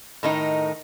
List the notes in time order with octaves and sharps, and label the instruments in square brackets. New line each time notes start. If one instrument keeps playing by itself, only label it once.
[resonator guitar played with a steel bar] A2 D#3 D#4